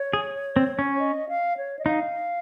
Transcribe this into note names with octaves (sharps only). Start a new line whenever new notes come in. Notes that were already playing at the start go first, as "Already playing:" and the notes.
Already playing: C#5
G#4
C4
C#4
D#5
F5
C#5
D#5
D#4 F5